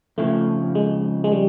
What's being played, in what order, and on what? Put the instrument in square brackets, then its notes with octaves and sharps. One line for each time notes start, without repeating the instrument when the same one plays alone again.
[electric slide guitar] F2 C#3 F3 [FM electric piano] A3
[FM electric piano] G#3
G#3
G3